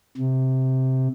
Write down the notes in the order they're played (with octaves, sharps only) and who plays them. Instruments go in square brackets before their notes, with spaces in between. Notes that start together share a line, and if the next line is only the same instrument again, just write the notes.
[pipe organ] C3